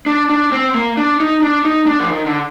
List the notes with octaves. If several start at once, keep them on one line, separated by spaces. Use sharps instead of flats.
D4
D4
C4
A#3
D4
D#4
D4
D#4
D4
F3
D#3
D3